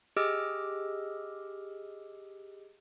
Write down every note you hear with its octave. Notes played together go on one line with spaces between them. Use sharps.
G4 G#4 D#5 D6 E6 F6